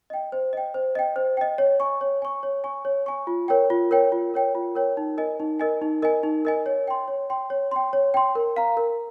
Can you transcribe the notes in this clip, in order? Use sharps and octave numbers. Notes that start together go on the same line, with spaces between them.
D#5 G5
C5
D#5 G5
C5
D#5 G5
C5
D#5 G5
C#5
G#5 C#6
C#5
G#5 C#6
C#5
G#5 C#6
C#5
G#5 C#6
F4
A#4 C#5 G5
F4
A#4 C#5 G5
F4
A#4 C#5 G5
F4
A#4 C#5 G5
D#4
A#4 D#5 G#5
D#4
A#4 D#5 G#5
D#4
A#4 D#5 G#5
D#4
A#4 D#5 G#5
C#5
G5 C6
C#5
G5 C6
C#5
G5 C6
C#5
G5 C6
A#4
F5 A#5
A#4